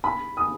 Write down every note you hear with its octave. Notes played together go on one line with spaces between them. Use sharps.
B5
D#6